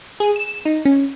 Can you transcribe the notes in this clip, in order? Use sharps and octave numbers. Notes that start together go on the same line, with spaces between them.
G#4
E7
D#4
C#4